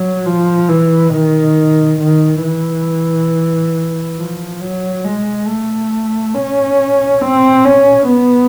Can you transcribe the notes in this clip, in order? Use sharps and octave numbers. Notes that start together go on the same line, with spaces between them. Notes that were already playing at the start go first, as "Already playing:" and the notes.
Already playing: F#3
F3
E3
D#3
D#3
E3
F3
F#3
G#3
A3
C#4
C4
C#4
B3